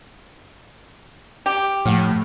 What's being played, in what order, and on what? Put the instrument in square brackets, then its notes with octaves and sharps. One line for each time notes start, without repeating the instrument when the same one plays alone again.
[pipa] G4
[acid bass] A2 [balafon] F3 A3 F#5